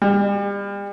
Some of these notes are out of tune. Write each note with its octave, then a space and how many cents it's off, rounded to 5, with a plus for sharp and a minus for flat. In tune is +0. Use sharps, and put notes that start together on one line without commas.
G3 +40